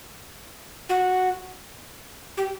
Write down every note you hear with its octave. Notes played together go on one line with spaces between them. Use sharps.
F#4
G4